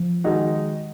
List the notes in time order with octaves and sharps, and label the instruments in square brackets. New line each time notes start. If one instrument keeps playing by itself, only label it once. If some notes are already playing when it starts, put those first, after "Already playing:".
Already playing: [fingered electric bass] F3
[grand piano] D#3 G#3 D#4 F#4